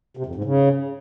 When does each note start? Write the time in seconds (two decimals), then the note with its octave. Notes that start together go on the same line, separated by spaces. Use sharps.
0.17 C3
0.26 F2
0.35 G#2
0.44 C#3